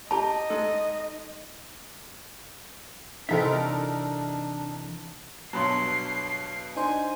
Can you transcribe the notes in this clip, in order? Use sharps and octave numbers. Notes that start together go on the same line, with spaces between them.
G4 D#5 A5 A#5
G#3 D#4 A4
C3 E3 G#3 C4 D#4 A4 A#4 E5
D4
G2 B2 F#3 A5 B5 C6 C7
D4 D#4 C5 G#5